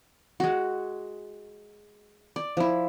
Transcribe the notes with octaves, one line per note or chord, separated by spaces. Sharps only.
G#3 F#4
D5
F3 E4